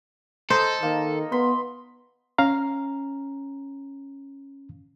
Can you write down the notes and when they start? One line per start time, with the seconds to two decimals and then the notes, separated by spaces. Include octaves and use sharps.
0.50 A4 C5 D#5 A#5
0.83 D#3 A#3
1.32 B3 B5 C6
2.38 C#4 F5 A#5